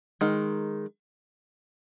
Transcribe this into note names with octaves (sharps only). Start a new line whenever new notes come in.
D#3 G#3